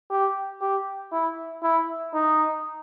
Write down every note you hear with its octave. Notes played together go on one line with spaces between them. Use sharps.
G4
G4
E4
E4
D#4